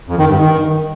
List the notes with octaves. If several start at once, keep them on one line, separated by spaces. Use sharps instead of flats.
F2
D#3
G2
D#3